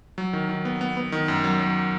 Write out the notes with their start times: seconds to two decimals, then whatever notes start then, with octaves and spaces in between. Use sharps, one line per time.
0.18 F#3
0.33 D#3
0.49 D#3
0.65 B3
0.81 B3
0.97 B3
1.12 D#3
1.28 F#2
1.44 F#3
1.59 F#3